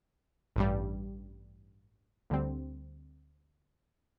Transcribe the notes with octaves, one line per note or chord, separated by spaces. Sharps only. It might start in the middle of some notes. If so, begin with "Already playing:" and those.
A1 G2 G3
D2 D3 G3 C4